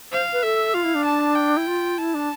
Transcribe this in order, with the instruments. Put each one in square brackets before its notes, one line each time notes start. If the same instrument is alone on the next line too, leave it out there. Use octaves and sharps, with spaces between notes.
[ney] C5 [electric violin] F5
[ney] B4
[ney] A4 [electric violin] E5
[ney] F4 [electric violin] F5
[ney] E4
D4
[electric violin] A5
G5
[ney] E4
F4
[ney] E4 [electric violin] A5
[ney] D4